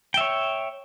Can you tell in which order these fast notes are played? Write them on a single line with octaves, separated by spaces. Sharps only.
G5 E5 C#5